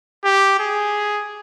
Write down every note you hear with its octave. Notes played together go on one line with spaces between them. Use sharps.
G4
G#4